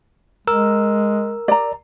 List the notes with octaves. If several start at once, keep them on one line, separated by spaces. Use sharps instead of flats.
G#3 A#4 E6
D5 A#5